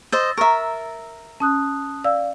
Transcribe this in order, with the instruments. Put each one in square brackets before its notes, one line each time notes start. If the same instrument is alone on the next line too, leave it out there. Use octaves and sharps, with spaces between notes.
[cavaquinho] C5 D#5 [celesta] E6 A6
[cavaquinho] A#4 E5 [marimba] A#5 C#6
[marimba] C#4 [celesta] A5 D#6 F#6
[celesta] D5 F5 [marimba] E6